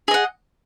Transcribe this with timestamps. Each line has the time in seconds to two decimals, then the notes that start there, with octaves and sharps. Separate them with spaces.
0.08 G#4
0.11 D#5
0.14 F#5